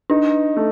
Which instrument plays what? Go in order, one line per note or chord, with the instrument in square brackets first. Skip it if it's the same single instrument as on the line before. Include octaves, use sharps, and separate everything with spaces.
[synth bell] D4 [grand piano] D#4
[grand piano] A3